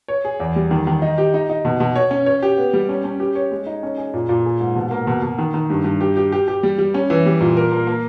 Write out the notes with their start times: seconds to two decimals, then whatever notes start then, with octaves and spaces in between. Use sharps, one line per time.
0.08 C#5
0.25 G#4
0.40 E2
0.56 G3
0.71 D#3
0.87 D#3
1.02 D#4
1.18 G4
1.34 D#4
1.49 D#4
1.65 B2
1.80 B2
1.96 C#5
2.11 C#4
2.26 C#5
2.42 G4
2.58 B3
2.73 G3
2.89 C#4
3.04 C#4
3.20 G4
3.35 C#5
3.51 G#3
3.67 D#4
3.83 C#4
3.98 G#4
4.14 A#2
4.29 A#2
4.45 G#4
4.60 G#2
4.76 B2
4.91 A#3
5.07 B2
5.22 B2
5.39 D#3
5.54 D#3
5.70 G2
5.84 G2
6.01 G4
6.17 G4
6.32 G4
6.48 G4
6.63 G3
6.79 G3
6.94 C#4
7.10 E3
7.26 G3
7.41 A#2
7.57 A#4
7.72 A#3
7.87 A#3